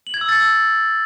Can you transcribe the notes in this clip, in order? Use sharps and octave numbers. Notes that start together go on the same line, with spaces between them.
F#7
G#6
E6
A6
E6